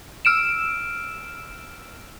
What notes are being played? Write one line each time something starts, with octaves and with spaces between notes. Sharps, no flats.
E6 F6 D7 E7